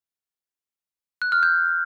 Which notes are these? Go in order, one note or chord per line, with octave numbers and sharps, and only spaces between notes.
F#6
F6
G6